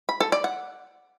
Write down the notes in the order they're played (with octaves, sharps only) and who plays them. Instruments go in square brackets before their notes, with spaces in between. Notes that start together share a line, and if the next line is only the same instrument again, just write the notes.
[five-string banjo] B5
A4
D5
F#5